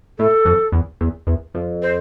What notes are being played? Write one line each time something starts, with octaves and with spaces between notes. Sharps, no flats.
A2 A4
F2
E2
E2
E2
F2
C5